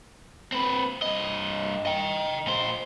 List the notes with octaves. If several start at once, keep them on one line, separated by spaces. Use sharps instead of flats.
C4 B4
G2 D#5
D#5 G5
A#2 C5